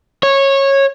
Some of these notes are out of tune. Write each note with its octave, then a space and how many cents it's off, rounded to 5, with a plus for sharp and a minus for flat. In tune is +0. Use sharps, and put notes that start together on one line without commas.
C#5 -15